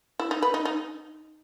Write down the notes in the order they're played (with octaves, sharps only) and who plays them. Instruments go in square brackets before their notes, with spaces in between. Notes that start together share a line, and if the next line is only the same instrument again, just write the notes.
[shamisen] E4
D#4
B4
D#4
D#4